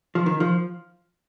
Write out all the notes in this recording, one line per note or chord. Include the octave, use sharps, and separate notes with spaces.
F3
D#3
F3